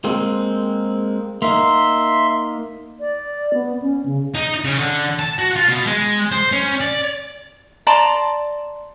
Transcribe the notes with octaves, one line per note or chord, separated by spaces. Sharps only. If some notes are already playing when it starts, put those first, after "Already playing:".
G#3 A#3 C4
A#3 D#4 E5 C6
D5
B3
C#4
C#3
D#4
C#3
D3
A5
F#4
F4
B2
G#3
C5
C#4
D5
D5 A5 A#5 C6